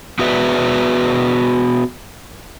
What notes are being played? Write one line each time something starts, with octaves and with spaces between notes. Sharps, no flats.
B3 F#4 G#4 B4 D5 E5